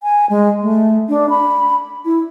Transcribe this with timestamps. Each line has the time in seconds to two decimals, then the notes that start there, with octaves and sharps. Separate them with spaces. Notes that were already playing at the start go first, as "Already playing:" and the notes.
0.03 G#5
0.30 G#3
0.62 A3
1.09 D4
1.30 B5
2.05 E4